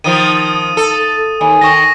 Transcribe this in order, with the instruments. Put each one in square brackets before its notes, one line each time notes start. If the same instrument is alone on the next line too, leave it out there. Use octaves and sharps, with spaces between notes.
[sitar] D#3 F3 [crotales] D#6 D#7
[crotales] D#6
[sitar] A4
[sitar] D#2 [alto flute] G#5
[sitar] D#3 D#5 [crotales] C#6 A#6